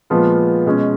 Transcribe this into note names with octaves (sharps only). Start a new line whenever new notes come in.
A#2 F3 G#3 B3 F4
B2 G#3 C#4